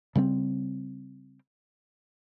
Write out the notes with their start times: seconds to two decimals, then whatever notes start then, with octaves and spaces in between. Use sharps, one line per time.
0.15 C#3 G3 A#3 C4